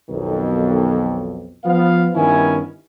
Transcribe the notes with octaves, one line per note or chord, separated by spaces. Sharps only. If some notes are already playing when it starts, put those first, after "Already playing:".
B1 F2 D#3
F3 B3 F5
G2 D#3 B3 C#4 E4 G#5